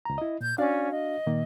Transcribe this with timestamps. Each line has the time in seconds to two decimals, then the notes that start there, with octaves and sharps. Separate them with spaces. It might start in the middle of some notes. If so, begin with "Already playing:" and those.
0.05 C#2 A#5
0.18 E4 D#5
0.41 A#2 G6
0.58 C#4 D4 F#4 D5 F5
0.91 D#5
1.26 A#2 D#3 A#3